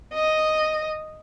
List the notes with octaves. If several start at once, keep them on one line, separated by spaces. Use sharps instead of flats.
D#5